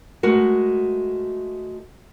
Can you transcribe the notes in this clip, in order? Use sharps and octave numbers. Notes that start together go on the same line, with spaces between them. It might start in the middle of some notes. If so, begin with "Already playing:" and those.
G#3 A3 F#4 A#4